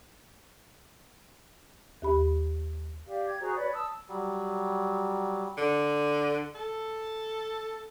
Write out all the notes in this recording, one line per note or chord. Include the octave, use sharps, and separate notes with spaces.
D#2 G4 B5
G4 D5 F5
G#6
F#4 G#4 C5 A#5
B4 C#5 D5 B5
A5 D#6 E6
F#3 G3
D3
A4